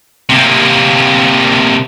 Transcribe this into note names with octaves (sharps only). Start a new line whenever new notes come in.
C3 A#3